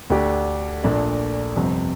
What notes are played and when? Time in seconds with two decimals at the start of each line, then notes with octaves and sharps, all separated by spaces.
0.10 D2 D3 A3 D4 G4
0.84 A#1 A#2 A3 D4
1.56 G1 F2 C3